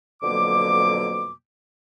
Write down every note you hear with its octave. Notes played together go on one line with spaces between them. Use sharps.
F2 B2 D3 F#3 A#3 D6